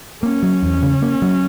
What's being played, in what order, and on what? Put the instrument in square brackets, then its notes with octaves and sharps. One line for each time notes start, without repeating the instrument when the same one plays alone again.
[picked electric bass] A#3 [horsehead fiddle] C#4
[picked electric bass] F#3
E2
C#3
A#3
F#3